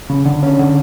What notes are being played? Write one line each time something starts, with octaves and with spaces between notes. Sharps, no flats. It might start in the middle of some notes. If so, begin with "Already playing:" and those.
C#3
D3
C#4
D3